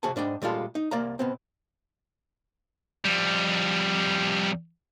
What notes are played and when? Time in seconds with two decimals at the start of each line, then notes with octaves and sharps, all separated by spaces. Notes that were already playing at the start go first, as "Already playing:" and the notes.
0.03 C3 F#4 G#4 G#5 A5
0.16 G#2 D4 D#5 G5
0.42 A#2 G3 G#3 F4 A4
0.75 D#4
0.91 C2 A#3 D5 F5 A#5
1.19 B2 B3 C4
3.05 F2 G3